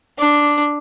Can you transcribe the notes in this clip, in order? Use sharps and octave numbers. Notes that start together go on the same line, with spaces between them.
D4